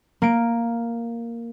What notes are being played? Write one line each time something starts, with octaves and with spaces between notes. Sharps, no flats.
A#3 D7